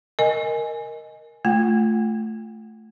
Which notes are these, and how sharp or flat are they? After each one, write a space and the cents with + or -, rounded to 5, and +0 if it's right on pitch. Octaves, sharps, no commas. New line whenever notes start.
A#4 +0 D#5 +0 G#5 +0
A3 +0 F4 -5 F#5 +0